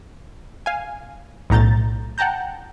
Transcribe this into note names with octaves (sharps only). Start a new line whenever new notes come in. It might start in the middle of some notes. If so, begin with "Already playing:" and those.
F5 G#5
B1 A2 A#5 G6 A6
F#5 G5 A5 A#5 G6